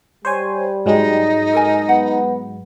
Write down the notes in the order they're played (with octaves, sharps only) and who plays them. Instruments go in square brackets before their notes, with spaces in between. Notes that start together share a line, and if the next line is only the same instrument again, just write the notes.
[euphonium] G3 [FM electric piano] C5 C#5 G#5
[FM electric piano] G#2 F#3 G#3 [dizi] D#4
[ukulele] A4 A#4 G#5
[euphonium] B3 [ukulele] F#5